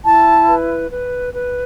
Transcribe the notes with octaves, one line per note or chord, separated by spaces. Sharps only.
E4 A5
B4
B4
B4